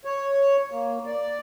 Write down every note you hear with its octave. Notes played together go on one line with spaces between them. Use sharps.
C#5
A#3
D5